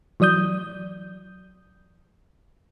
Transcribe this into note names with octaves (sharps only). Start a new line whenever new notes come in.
E3 F#3 D5 D#6 G6